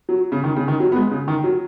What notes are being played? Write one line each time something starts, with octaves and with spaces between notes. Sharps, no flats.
F#3
C#3
D#3
C#3
D#3
F#3
B3
G#3
C#3
D#3
F#3